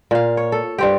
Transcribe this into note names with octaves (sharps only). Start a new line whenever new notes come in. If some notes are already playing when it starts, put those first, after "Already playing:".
A#2 F5
C#5
A4
G2 C4 G4